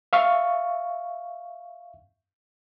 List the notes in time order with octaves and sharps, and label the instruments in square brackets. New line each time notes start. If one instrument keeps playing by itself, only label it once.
[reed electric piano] E5 F5 C#6